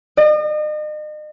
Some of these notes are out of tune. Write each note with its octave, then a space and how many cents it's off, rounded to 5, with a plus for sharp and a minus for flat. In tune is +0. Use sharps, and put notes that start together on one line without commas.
D#5 -40